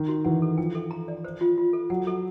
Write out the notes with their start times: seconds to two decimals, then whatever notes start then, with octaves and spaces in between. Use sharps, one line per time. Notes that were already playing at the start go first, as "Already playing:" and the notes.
Already playing: D#3
0.08 F#4
0.25 E3 F#5
0.42 A4
0.58 F3 G5
0.75 A4
0.91 A#5
1.08 D5
1.24 C5
1.41 F4
1.58 F4
1.73 A4
1.90 F#3 F#5
2.07 A4